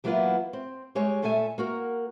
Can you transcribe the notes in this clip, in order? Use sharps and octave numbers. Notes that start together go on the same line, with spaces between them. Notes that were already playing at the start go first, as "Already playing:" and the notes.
E3 F#3 A#3 B3 E4 F4
C4
G3 G#3 C#5
A#2 A3 A4 E5 G#5
A#3 F#4 A#4